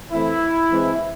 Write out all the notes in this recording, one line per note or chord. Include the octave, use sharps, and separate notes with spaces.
E3 A3 C4 E4
E3 G#3 C4